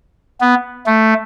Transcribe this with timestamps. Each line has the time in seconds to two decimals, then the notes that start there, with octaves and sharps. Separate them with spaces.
0.40 B3
0.86 A3